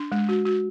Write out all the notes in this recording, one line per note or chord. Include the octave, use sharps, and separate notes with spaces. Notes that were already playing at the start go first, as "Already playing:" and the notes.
Already playing: D4
G#3
F#4
F#4